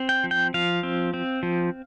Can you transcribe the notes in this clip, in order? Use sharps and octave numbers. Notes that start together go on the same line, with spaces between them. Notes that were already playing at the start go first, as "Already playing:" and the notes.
Already playing: C4
G5
F3
G5
F3 F5
C4
C4
F3